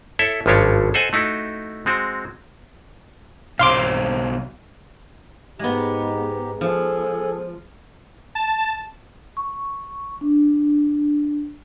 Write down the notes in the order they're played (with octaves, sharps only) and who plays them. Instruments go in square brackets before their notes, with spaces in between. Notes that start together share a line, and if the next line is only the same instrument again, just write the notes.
[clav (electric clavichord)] E4 A4 C#5 E5
G#1 G2 F3 C#4 D4 C#5
A4 C5 D#5 F#5 G#5
A3 D#4 E4 F#4
G#3 C4 F#4
[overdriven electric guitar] B1 C4 [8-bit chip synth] F5 C6 D6
[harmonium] G#2 D#4 G4 [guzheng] G#3 B3
[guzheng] F3 [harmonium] G#4 A4
[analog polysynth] A5
[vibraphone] C#6
D4